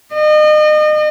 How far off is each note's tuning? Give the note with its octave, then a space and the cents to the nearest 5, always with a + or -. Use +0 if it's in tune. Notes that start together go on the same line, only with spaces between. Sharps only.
D#5 -35